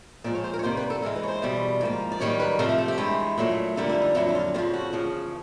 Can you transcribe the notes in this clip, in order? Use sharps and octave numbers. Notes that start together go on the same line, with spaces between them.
A#2 F3 G#3 D5
C#5
C5
A#4
C#5
C3 D#3 G3 A#3 C5
B4
A4
G#2 E3 G#3 A#4
B4
C#5
C5
E2 B2 G3
G#2 F3 A#3
D5
F#2 D#3 G3 A#3 C#5
B4
C3 F3 A3 A#4
A#4
A4
G4
G2 E3 G#3
A#2 F#3 A3
F2 D3 G3 A#3
E4
D#4
F2 D3 F#3 E4
E4
F4
F2 C#3 F3 F4
F#4
E2 C#3 F3